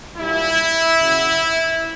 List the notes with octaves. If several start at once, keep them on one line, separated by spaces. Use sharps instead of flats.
A#2 G3 A#3 D4 E4
C#3 F#3 B3